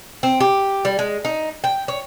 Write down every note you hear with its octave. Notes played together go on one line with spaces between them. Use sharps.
C4
G4
G3
G#3
D#4
G5
C#5